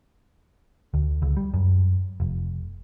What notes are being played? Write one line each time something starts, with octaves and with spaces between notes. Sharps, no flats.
D2
C#2
G3
F#2
F1